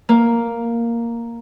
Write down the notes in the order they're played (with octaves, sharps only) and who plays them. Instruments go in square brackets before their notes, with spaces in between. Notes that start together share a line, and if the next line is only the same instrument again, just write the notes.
[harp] A#3